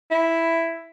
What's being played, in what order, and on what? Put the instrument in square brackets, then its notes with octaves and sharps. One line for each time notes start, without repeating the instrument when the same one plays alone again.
[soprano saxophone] E4